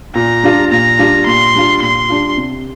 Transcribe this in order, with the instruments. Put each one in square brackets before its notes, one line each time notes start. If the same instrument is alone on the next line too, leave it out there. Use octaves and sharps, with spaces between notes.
[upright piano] A#2 [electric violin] A#5
[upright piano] G3 D4 F4
[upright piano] A#2 [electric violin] A#5
[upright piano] G3 D4 F4
[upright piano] A#2 [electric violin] C6
[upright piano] G3 D4 F4
[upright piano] A#2 [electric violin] C6
[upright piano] G3 D4 F4
C3